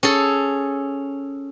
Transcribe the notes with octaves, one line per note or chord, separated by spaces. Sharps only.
C#4 G#4 A4